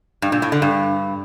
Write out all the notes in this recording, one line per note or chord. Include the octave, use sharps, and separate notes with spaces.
G2
A#2
A2
D3
G2